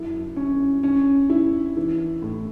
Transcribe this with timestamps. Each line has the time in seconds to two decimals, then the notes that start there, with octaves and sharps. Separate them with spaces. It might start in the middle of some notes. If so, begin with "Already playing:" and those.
Already playing: F#2 E4
0.36 C#4
0.83 C#4
1.30 E4
1.77 E3
2.22 A2